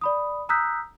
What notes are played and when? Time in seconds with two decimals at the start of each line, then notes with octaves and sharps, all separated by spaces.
0.01 D5 B5 D#6
0.49 A#5 D#6 E6 F#6 G6 B6